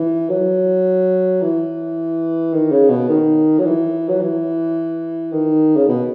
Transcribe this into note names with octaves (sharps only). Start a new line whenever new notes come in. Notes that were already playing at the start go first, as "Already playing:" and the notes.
Already playing: E3
F#3
E3
D#3
C#3
B2
D#3
F#3
E3
F#3
E3
D#3
C#3
B2